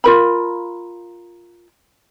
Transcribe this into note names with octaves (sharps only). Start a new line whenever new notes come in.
F4 A#4 B5